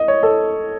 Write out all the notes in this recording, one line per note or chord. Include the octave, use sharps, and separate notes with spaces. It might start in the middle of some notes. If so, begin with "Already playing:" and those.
Already playing: D#5
C#5
A4